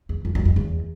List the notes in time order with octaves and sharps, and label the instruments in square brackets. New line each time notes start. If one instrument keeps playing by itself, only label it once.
[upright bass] E2
F2
F#2
F2
E2